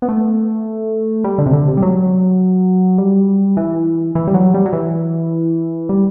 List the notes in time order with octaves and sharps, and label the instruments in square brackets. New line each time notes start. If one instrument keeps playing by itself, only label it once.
[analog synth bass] B3
A3
G3
D3
C3
D3
C3
G3
F#3
G3
E3
E3
G3
F#3
G3
F#3
E3
G3